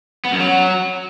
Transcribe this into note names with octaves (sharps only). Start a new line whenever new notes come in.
B3
F#2
F#3